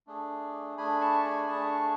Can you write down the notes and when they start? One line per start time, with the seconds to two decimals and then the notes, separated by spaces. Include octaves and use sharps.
0.07 A3 D4 G#4
0.77 A3 D4 G#4 G#5 B5
1.01 A5 C#6
1.25 G#5 B5
1.48 A3 D4 G#4 A5 C#6